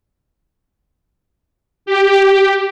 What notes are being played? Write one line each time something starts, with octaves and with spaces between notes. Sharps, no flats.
G4